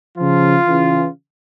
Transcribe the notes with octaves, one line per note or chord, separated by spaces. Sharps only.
C#3 F3 F4
C#3 E3